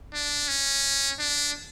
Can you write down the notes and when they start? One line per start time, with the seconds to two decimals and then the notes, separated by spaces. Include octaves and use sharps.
0.14 D4
0.48 C#4
1.19 D4